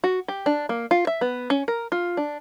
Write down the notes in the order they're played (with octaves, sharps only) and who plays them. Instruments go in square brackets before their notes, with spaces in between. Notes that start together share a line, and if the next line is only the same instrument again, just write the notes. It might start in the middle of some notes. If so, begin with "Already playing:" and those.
[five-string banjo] F#4
G4
D4
A#3
F4
E5
B3
C#4
A#4
F4
D4